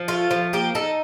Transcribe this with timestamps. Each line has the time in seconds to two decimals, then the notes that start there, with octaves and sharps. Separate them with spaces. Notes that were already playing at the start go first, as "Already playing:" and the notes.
Already playing: F3
0.08 A3 F4
0.31 F3
0.53 A#3 G4
0.75 D#4 A4